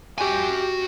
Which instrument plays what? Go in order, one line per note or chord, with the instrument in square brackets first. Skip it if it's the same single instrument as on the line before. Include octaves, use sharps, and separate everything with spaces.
[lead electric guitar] F#4 G#5 [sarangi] G4